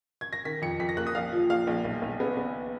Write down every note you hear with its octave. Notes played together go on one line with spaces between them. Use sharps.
G#6
A#6
D#3 B6
F2 C#7
F2 B6
A#6
A#3 F#6
D#6
A#1 F5
F3
A#1 F5
A#1
B1
B1
B3
B3